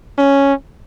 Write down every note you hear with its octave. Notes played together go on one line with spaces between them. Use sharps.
C#4